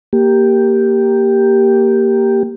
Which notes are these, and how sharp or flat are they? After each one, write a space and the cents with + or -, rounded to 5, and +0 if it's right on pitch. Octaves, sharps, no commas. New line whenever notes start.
A#3 +0 G4 +0